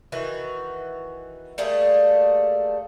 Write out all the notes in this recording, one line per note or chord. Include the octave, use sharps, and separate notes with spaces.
D#3 E3 F#4
G3 A3 A#3 G#4